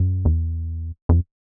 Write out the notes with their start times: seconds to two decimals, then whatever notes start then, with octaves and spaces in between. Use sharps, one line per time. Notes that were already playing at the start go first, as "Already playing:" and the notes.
Already playing: F#2
0.25 E2
1.09 F2